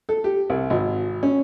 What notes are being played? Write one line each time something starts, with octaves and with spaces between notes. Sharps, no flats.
A4
G4
C2
G#1
C#4